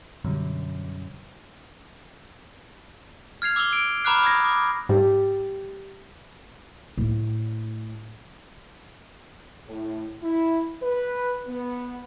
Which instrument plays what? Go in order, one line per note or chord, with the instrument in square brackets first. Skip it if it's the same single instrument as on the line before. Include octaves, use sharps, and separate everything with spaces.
[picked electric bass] F#2 [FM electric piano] B2 D3 G3
[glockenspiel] F6 G#6 C7 F7
D6 E6 F7 G7
D7
A#5 B5 D6 F6 F#6 C7
D#6 G#6 A#6
D6
[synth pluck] G#2 [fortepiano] G3
[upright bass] A2 A3
[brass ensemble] A2
E4
B4
B3